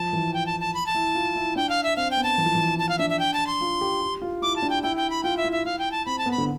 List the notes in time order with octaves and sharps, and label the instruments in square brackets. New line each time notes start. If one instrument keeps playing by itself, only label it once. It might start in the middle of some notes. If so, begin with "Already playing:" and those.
Already playing: [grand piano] F3 [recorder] A5
[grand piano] E3
[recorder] G5
A5
A5
B5
A5
[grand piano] E4
F4
E4
[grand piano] D4 [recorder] G5
[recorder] F5
E5
[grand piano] C4 [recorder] F5
[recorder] G5
[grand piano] B3
[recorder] A5
[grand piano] E3
F3
E3
[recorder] A5
F5
[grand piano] D4 [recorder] E5
[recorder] E5
G5
A5
C6
[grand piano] F4
G4
G4
F4
[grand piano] E4 [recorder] D6
[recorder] A5
[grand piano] D4
[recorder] G5
[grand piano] E4 [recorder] G5
[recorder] G5
B5
[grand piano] F4 [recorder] G5
[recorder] E5
[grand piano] E4
[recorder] E5
[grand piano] E4 [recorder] F5
[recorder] G5
A5
[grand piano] C4 [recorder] B5
[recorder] A5
[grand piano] B3
[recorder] B5
[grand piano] D3